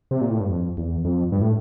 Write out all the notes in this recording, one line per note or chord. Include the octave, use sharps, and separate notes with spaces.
C3
A#2
A2
G2
F2
E2
F2
G2
A2